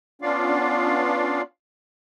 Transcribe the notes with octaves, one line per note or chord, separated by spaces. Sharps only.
B3 C#4 D4 F4 D5 F5